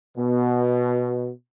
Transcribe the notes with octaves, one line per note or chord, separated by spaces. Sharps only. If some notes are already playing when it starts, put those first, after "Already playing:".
B2